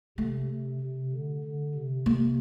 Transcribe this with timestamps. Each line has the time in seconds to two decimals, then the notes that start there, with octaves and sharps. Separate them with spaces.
0.18 C3 A3
0.50 C3
0.81 C3
1.12 D3
1.44 D3
1.75 C3
2.06 C3 A#3